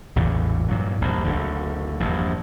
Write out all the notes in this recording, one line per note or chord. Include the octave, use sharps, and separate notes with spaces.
A1 E2 A#2 C#3
G2 A#2 F#3
A#1 E2 G2
F#1 D2 D3
A#1 E2 G2